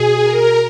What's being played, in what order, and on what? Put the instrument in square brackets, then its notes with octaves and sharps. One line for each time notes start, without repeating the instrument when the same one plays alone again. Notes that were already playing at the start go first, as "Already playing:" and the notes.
Already playing: [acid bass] B2 [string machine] G#4
[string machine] A#4